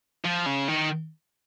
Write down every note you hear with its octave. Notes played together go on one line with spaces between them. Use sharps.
F3
C#3
D#3